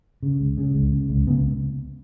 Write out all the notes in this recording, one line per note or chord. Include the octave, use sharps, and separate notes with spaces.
C#3
C#2
C#3
C#2
C#3
C#2
C#3 B3